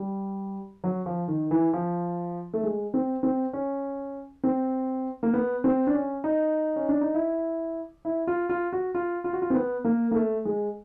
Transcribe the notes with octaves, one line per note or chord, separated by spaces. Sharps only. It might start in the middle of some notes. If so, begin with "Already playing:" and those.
Already playing: G3
F#3
F3
D#3
E3
F3
A3
G#3
C4
C4
C#4
C4
A#3
B3
C4
D4
C#4
D#4
C#4
D4
D#4
E4
E4
F4
F4
F#4
F4
F4
F#4
F4
C4
B3
A#3
A#3
A3
G#3